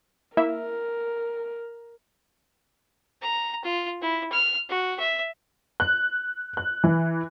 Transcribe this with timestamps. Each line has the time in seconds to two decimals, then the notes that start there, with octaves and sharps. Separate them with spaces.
0.37 A#3 E4 A#4 E5
3.22 A#5
3.64 F4
4.02 E4
4.32 F6
4.70 F#4
4.99 E5
5.80 F#6
6.57 F#6
6.84 E3